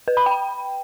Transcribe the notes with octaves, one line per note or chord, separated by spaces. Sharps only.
B4
B5
G5